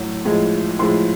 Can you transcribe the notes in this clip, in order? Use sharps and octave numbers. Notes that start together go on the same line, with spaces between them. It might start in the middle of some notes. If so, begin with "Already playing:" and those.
Already playing: A2 F#3
A2 F3 G#3
A2 F3 G#3 C6